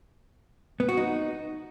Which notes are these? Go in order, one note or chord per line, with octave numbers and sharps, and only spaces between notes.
B3
F#4
D#4